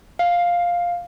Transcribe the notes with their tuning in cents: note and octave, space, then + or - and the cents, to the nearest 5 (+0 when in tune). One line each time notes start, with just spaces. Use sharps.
F5 +5